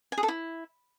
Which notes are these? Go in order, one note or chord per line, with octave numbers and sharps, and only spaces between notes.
G#5
G#4
A4
E4